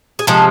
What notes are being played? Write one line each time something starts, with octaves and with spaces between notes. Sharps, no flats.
G#4
C3 F3 G#3 A4